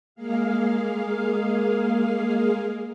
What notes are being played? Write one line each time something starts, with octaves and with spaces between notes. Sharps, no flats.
G#3 A#3 G#4 F5